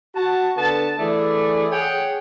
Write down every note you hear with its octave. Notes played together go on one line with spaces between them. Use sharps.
F#4 A5
D3 B3 A5
E3 A3 G#4 D5
G#4 C#5 F#5 G5